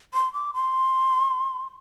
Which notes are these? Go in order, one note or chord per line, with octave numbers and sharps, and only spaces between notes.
C6
D6
C6